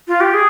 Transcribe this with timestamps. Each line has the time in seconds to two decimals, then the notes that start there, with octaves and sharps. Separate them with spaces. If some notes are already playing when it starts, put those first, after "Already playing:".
0.08 F4
0.20 G4
0.34 G#4